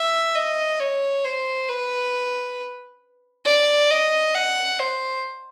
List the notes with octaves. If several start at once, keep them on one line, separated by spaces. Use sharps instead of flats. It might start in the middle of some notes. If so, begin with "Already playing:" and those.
Already playing: E5
D#5
C#5
C5
B4
D5
D#5
F#5
C5